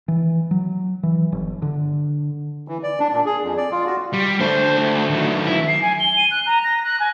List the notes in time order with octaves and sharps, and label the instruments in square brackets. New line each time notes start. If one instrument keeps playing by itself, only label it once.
[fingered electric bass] E3
F#3
E3
G1
D3
[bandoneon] E3
D5
D4
A#2
G#4
F2
D5
F4
F#4
[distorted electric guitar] G3
[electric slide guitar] D3 A3 D4 [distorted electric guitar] C5
[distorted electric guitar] D2
D#3 F#3
[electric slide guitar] E4
[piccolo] C7
G#5
G7
D#7
F#6
A#5
A#6
F#6
G#5